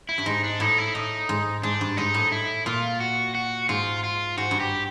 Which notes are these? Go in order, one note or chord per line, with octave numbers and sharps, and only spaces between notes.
E4
G2
G#2 D#4
D4
A2 D#4
E4
A2 D#4
G#2
G#2 D4
G2
G#2 D#4
A2
E4
A#2 F4
F#4
F#4
G#2 F4
F4
G#2 F#4
G2
G4